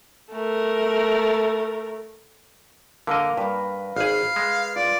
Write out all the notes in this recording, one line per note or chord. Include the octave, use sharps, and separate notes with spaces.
A3 A#4
D3 A#3 A#4 D#5
G2 B4
G#1 G#4 F5
G#3
F4 D5